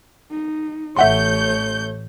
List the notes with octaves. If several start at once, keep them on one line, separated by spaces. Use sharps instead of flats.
D#4
A1 A3 C#5 E5 F#5 C6 G6